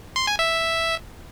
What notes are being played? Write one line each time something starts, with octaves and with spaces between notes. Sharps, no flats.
C6
G#5
E5